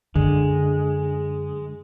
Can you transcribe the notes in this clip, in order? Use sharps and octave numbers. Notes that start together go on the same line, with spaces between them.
F#2 D3 G#3